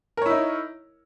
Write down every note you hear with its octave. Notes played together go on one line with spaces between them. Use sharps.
D#4 E4 A#4 C#5